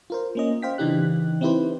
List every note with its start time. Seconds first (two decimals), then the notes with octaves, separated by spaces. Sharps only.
0.10 F4 A#4 C5
0.35 A#3 C#4 D#5
0.62 C5 F5 G5 B6
0.78 C#3 E3 D4 D#4 G4 F#6
1.41 C4 D#4 E4 G4 B4 C5